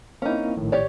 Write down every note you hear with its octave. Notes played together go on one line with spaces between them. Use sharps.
A#3 C4 C#4 D#4 E4
A#1 A2 D#3
G4 C#5 D5